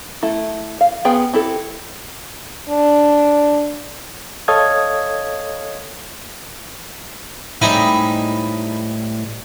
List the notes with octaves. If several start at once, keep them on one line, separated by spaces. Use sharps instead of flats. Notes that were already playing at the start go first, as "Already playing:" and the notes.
A3 E4
F5
B3 F4 G#4 G5
C4 E4 G4 A4
D4
A4 C#5 D#5 F5 D#6 G#6
A2 G3 G#3 C4 D#4 E4